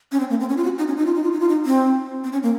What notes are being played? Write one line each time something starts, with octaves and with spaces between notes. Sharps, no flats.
C#4
C4
A#3
C4
C#4
F4
F#4
D#4
C#4
D#4
F4
D#4
F4
D#4
F4
D#4
C4
C4
C#4
A#3